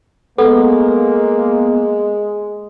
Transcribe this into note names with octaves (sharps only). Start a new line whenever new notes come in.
G#3 A#3 B3 A4